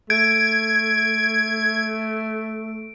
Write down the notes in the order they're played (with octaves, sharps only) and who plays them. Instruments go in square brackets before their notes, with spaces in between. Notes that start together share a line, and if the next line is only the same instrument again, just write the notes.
[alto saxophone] A3 [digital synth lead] G#6 [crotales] D7